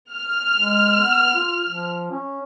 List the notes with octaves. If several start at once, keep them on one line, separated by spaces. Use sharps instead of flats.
F6
G#3
B3
F4
F3
C#4